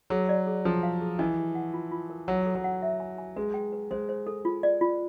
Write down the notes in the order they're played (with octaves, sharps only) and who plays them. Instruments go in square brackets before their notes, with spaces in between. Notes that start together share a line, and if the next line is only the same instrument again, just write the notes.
[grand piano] F#3 [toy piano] G#4
[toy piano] D5
G#4
[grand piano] F3 [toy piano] G#4
[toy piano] F5
G#4
[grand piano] E3 [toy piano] D#5
[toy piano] G4
F#5
F4
F4
A#4
[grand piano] F#3 [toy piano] F#5
[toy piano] A4
[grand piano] F#3
[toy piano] F#5
E5
G#5
G#5
[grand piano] G#3 [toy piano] B4
[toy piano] G5
B4
[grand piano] G#3 [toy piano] C5
[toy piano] C5
A4
F4
D5
F4